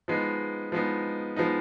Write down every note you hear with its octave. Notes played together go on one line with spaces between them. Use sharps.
F3 G#3 B3 D#4
F3 G#3 B3 D#4
F3 G#3 B3 D#4